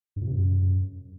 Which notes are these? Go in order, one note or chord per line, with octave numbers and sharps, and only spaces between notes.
G2
A#2
C3
F#2